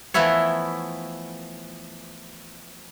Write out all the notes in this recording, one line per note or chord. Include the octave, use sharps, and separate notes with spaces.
E3 F3 A3 B3 E4 C#5